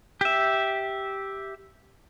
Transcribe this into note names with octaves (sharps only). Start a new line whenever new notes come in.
G4 E5